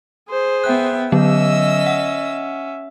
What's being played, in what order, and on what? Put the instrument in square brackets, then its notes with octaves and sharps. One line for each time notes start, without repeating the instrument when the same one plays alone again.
[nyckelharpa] G#4 C5
[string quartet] B3 E5 G5 [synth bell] F#6
[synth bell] D3 F#3 B3 [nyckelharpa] C#4 E5 [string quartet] D#5 E6
[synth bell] F#5